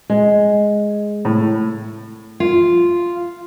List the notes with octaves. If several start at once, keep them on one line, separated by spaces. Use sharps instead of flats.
G#3
A2
F4